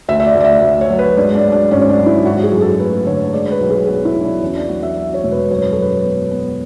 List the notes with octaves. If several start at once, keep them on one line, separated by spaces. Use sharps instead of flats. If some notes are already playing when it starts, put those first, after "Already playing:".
D2 E5
E5
D5
D2
D5
E5
D2
C#5
F#3
B4
G#2 D4
D4
F#3
D4
G#1 C#4
D4
F#3
E4
G#1 F#4
G#4
F#2
A4
A3 B4
D3 C#5
G#3 D5
C#5
B4
B1
G#4
B3 F#4
E4
B1
D4
E2 C#4
D4
F#3 F#4
E5
F#3
C#5
E1
B4
F#2 C#5
B4
A4
F#2 B4
B3
B3